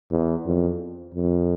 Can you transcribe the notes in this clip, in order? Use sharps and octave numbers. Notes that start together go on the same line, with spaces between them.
E2
F2
F2